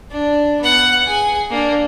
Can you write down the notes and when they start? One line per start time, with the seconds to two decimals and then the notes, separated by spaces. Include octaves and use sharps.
0.11 D4
0.61 B3 F#5
1.06 G#4 G#5
1.51 A#3 D4